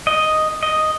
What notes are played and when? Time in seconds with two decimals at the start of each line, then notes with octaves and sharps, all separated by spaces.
0.07 D#5
0.63 D#5